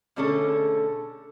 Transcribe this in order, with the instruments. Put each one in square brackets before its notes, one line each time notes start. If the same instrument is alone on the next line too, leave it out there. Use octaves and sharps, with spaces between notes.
[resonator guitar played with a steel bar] B2 D3 A3 C#4 G#4 A4